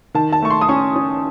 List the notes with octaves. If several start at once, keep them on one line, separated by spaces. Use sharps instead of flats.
D#3 A5
A5
A3 C#6
C6
D#6
C#4 C#6
C#4